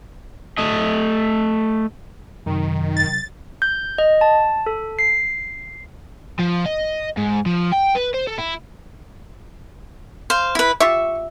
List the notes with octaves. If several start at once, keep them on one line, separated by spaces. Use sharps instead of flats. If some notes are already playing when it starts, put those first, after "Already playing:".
A3 D#5
F#2 C3 D#3 F#3
A6
G6
D#5
A5
A4
C7
F3
D#5
G#2
F3
G5
B4
C5
A4
E4
C5 F5
E4 B4
F4 G4 E5 C#6